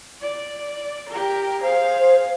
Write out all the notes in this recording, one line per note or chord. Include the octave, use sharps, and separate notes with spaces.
D5
G4 A#4
G#4 C5 F5